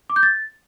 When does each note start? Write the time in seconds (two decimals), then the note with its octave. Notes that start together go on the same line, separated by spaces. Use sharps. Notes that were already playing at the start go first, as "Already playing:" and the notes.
0.10 D6
0.16 G6
0.23 A6